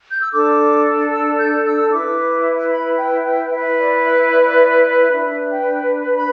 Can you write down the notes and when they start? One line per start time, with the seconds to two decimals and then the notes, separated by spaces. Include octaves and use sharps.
0.11 G6
0.22 E6
0.32 D4 A4 D6
1.12 E6
1.39 G6
1.65 E6
1.92 E4 B4 D6
2.71 B5
2.98 G5
3.25 G5
3.52 E4 B4 E5
3.78 D5
4.05 E5
4.31 D5
4.38 E5
4.46 D5
5.10 D4 B4 E5
5.51 G5
6.16 B5